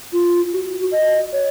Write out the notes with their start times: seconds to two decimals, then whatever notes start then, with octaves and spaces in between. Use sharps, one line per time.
0.13 F4
0.53 F#4
0.92 D#5
1.33 C#5